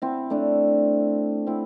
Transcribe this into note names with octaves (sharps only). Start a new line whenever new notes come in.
C4 E4
A3 D4
C4 E4